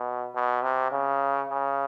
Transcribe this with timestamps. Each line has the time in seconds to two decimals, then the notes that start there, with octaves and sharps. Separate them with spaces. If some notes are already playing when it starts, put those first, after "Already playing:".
Already playing: B2
0.35 B2
0.63 C3
0.91 C#3
1.49 C#3